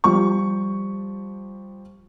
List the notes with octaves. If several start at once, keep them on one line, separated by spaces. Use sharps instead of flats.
F3 G3 G4 C#6